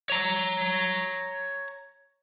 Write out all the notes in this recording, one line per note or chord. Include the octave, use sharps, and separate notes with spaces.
C#5 A#5